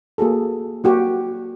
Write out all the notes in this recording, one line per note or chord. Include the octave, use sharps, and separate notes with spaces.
A#3 F#4 G#4 A4
A#3 F#4 G4